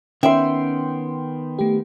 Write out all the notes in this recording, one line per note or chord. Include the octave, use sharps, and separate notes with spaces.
D#3 B3 C#4 E5 G5 C6
A3 G4